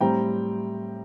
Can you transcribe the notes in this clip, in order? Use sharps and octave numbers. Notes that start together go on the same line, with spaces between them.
A2 G3 C4 G5 A#5